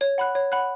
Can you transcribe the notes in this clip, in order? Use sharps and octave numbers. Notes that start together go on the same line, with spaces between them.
C#5
F#5 B5 F#6
C#5
F#5 B5 F#6